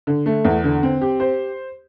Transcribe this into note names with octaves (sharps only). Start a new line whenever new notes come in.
D3
A3
E2
D3
C4
G4
C5